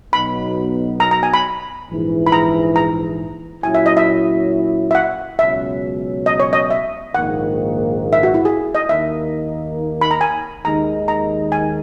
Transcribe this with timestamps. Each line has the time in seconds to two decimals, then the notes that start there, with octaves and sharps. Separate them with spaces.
0.13 B1 B2 F#3 B3 D#4 B5
1.00 A#5
1.11 A#5
1.23 G#5
1.34 B5
1.89 A#1 G#2 E3
2.27 B5
2.32 A#5
2.76 A#5
3.63 A#2 F#3 C#4 E4 G#5
3.75 E5
3.86 D#5
3.97 E5
4.91 E5
4.95 F#5
5.39 C#2 B2 F#3 C#4 E5
6.26 D#5
6.40 C#5
6.53 D#5
6.71 E5
7.14 A#1 G#2 D#3 A#3 F#5
8.13 E5
8.23 F#4
8.34 E4
8.45 G#4
8.75 D#5
8.89 D#2 D#3 A#3 D#4 E5
10.01 B5
10.11 A#5
10.21 G#5
10.65 D#2 D#3 G#3 D#4 A#5
11.08 A#5
11.52 G#5